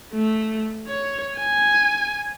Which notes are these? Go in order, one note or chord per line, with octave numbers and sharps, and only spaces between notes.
A3
C#5
G#5